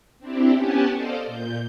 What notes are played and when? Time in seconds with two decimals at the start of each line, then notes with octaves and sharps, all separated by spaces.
0.19 C4 D4 E4 G4
0.54 B3 C#4 G4 F#5 G#5 A5
0.94 A4 C5 D5 D#5 F5
1.26 A#2 G6